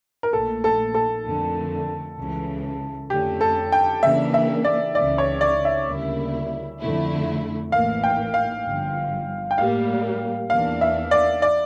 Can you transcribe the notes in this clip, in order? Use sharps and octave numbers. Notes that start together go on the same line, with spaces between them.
A#4
A#1 A#2 A3 A4
A4
A4
F2 D3 A3
C#2 C#3 E3
F2 D3 A3 C#4 G4
A4
G5
C#3 E3 A#3 D4 E5
E5
D5
C#2 C#3 E3 D5
C#5
D5
E5
D2 C#3 G3 A#3 E4
F2 D3 A3 E4
A1 A2 E3 A#3 F5
G5
F5
G1 G2 F3
G5
A2 G3 A#3 F5
E2 E3 A#3 D4 F5
E5
D5
D5